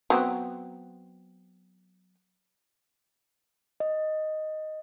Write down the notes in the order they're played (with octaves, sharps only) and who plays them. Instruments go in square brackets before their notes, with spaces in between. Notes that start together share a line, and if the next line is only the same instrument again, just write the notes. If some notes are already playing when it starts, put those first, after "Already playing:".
[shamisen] F#3 B3 C4
[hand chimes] D#5